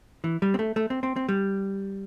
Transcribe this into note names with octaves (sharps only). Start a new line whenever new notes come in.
E3
G3
C4
A3
A3
C4
C4
C4
G3